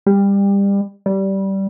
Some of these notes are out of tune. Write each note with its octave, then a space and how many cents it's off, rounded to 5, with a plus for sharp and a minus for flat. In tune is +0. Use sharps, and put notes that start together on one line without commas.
G3 +25
G3 -15